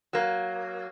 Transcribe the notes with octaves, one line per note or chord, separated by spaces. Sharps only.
F#3 A#3